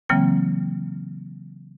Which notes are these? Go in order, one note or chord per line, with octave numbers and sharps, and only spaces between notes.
C#3 E3 F#3 A#3 C4 G5